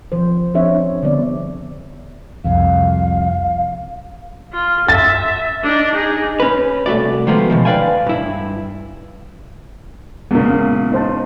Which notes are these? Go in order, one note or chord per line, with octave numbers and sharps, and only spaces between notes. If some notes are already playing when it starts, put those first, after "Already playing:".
F3 C5
F3 C4 D4 G#4 C#5 E5
D3 G3 B3 D5
C2 F2 F5
F4
E5 A6
D4 D#4
D#4 G#4
C#4 B4
C2 A3 F#4 D5
D#3 F3 G#3 A3 B3
B2 D#3 F3
B4 D5 F5 G5 G#5
G2 E4
E2 A#2 C#3 G#3 A#4
D#4 C5 A5